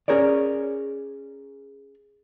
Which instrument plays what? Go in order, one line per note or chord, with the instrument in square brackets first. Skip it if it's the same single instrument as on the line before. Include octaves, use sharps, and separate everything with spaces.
[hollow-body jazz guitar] C#4 G#4 A#4 C#5 D5